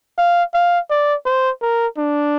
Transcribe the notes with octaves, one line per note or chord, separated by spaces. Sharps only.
F5
F5
D5
C5
A#4
D4